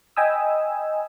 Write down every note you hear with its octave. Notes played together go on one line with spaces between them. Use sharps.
D#5 G5 G#5 B5 D#6 E6